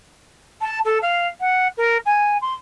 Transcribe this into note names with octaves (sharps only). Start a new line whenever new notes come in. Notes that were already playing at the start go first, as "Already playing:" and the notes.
A5
A4
F5
F#5
A#4
G#5
C6